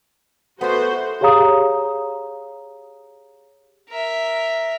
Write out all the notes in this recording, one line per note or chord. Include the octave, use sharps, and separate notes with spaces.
A3 B3 F#4 A#4 C5
G4 G#4 C#5 F5 A#5 D#6
A#4 E5